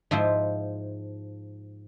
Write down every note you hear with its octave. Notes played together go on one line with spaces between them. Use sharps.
G#2 F3 E4 C5